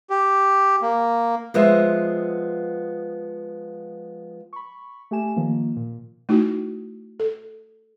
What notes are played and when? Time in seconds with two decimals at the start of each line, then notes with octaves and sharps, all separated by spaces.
0.10 G4
0.82 A#3
1.54 F3 G#3 B3 C5 E5
4.53 B5 C#6
5.11 A3 G4 G#5 E7
5.36 D#3 F3 A#3
5.77 A#2
6.29 A3 D#4 E4 F#4
7.20 A4